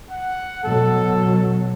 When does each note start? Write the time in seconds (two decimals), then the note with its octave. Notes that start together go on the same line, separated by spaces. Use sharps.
0.11 F#5
0.64 B2 F#3 A4